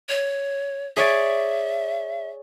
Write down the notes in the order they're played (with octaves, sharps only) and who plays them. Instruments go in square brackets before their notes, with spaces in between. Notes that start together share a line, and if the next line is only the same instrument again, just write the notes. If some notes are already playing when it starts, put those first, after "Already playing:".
[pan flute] C#5
[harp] G#4 C#5 D5 [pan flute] E5